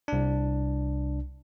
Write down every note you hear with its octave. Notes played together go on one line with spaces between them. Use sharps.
C2 D4